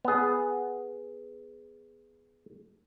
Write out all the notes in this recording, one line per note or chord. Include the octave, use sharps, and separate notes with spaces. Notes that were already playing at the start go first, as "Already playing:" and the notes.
B3 G#4